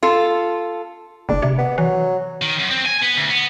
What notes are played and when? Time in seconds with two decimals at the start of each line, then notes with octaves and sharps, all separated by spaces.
0.03 F4 A4
1.29 F#1 D4
1.42 C3
1.58 B3
1.78 E3 F#3
2.42 D#3
2.59 F#2
2.71 C4
2.86 G#5
3.03 B3
3.18 D2
3.30 B3